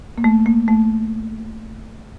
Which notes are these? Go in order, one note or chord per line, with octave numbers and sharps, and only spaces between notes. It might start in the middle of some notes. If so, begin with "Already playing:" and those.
A#3
A3
A#3
A3